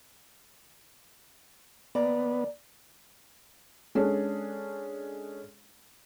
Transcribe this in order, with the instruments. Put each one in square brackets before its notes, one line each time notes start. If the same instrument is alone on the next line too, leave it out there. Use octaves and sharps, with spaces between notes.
[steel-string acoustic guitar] D#2 D5 A#5 [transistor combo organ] B3
[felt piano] G#3 C#4 D4 G#4 A4